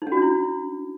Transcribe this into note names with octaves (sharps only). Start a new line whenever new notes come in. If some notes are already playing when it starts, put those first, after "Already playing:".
D#4
C#4
F#4
D4
E4